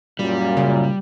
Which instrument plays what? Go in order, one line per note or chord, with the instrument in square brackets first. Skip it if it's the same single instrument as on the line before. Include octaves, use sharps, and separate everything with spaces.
[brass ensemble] F#2 A#2 [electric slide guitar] G3
[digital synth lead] C#3